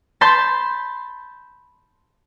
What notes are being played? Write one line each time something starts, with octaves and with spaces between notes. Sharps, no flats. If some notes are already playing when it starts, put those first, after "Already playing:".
A5 B5 C6 G6 A6